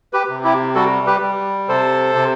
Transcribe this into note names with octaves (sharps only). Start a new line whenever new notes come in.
G4 B4
C3
E4 G4
G3 F#4 A4
G4 B4
G3
C3 A4 C5
C3